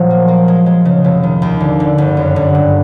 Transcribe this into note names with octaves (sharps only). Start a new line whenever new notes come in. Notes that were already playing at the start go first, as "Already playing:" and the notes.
Already playing: A#2 F3 F#3
A#3
A#3
G#3
G#3
C#3
F1
D#3
D#2
D3
D3
G1
F#2
D3
G2